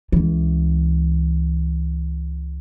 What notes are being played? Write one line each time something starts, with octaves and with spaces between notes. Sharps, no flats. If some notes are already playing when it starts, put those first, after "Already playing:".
C#2 E3